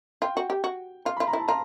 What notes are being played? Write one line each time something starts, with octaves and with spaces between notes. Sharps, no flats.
F4 G5
F#4
G4
F#4
F4 C6
F4 B5
A#5
E4 A5
F4 A#5